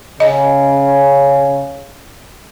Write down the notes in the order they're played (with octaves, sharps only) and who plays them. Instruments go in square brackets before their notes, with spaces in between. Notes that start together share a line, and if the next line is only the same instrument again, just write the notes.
[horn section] C#3 [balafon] D#5